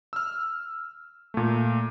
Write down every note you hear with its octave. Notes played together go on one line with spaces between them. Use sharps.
E6 F6
A#2 A3